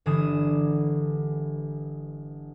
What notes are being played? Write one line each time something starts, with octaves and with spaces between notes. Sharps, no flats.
G1 D3 E3 G#5 D#6 E7